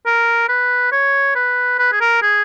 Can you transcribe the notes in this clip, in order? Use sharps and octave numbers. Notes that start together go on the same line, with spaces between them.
A#4
B4
C#5
B4
B4
G#4
A#4
G#4